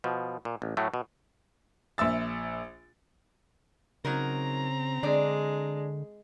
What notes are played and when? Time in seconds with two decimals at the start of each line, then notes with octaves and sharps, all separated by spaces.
0.04 B2 F3
0.45 A#2
0.62 A1
0.77 A2 F#3 A3
0.94 B2
1.98 A#1 E5 E6 A6
4.05 C#3 F#3 C4 D#4 A#4 A#5
5.03 D3 G#3 D4 D5